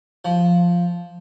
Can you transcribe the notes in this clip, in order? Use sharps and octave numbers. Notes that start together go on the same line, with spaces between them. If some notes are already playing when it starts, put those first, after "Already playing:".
F3